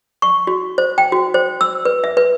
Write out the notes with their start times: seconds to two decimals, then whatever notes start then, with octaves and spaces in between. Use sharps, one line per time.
0.22 C#6
0.47 F#4
0.78 C5
0.98 G5
1.12 F#4
1.34 C5
1.61 E6
1.85 B4
2.04 E5
2.17 B4